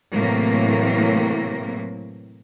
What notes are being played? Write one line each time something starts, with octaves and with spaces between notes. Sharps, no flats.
A2 C3 E3 F#3 A#3